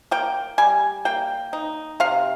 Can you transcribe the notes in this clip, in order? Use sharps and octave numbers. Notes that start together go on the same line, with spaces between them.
A#3 G5
G3 G#5
A#3 G5
D#4
C3 F5